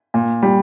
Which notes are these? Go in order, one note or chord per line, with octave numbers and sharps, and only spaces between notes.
A#2
G3